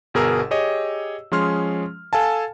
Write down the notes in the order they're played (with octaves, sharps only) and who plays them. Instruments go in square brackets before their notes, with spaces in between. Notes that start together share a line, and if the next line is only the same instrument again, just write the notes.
[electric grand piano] G1 B2 G#4 A#4 A#5 E6
G4 G#4 C#5 D#5
F3 G#3 C#4 G#4 C6 F6
A4 F5 G#5 A5